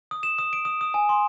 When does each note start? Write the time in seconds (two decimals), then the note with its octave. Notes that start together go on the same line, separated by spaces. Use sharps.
0.11 D#6
0.23 E7
0.39 D#6
0.53 D7
0.65 D#6
0.81 D#6
0.94 G#5
1.09 C6